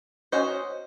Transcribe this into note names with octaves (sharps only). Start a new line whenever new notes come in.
C#4 F#4 C5 D#5